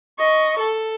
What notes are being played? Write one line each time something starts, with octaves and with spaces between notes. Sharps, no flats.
D#5 C#6
A4